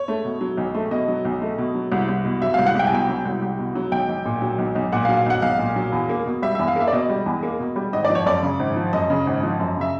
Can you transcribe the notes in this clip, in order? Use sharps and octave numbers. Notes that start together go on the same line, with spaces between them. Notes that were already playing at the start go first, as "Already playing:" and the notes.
Already playing: C#5
A3
B2
F#3
B1
A3
B2 D#5
F#3
B1
A3
B2
F#3
C2
C2
B2
F#3 E5
C2 F5
F#5
C2 G5
G#5
B2 G5
F#3
C2
C2
B2
F#3
B1 G5
B1
A#2
F#3
B1
B1
A#2 F#5
F5
F#3
F5
B1 F#5
B1 F5
A#2
F#3
E2
A#3
B2
G3 E5
E2 E5
F5
A#3 E5
D5
B2 D#5
G3
E2
A#3
B2
G3
G#1 D#5
D5
F3
C#5
F#2 D5
C#3
G#1
F3
F#2 D#5
C#3
G#1
F3
F#2
C#3 E5